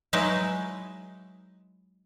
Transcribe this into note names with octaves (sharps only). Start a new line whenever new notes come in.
F#3 G#3 D#4 E4 B4